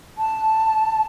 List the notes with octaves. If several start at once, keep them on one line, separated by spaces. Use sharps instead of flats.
A5